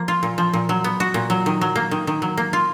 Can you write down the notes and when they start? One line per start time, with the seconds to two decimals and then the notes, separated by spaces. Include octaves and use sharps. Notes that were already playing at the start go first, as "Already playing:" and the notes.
Already playing: F3 A#3
0.08 F4
0.23 A#2
0.38 F3
0.53 A#2
0.69 F#3
0.84 B3
1.00 F#4
1.14 A#2
1.30 F#3
1.46 D#3
1.61 F#3
1.76 A#3
1.91 D#3
2.07 D#3
2.22 F#3
2.37 A#3
2.53 F4